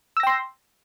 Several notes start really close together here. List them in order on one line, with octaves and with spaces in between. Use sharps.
E6 A#6 G5 C6